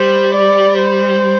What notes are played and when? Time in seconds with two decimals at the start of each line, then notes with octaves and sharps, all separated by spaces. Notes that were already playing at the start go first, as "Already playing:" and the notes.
Already playing: G3 C5
0.35 D5
0.78 C5